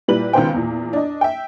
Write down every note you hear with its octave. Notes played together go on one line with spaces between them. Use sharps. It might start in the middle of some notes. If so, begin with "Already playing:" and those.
A#2 G3 E4 B4 F#7
C#2 B2 D#3 B4 C5 G5
E2 A#2
D4 D#5
E5 G5